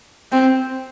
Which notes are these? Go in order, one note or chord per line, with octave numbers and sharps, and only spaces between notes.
C4